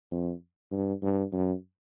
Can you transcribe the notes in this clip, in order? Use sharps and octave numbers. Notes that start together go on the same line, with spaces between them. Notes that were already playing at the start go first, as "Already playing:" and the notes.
F2
G2
G2
F#2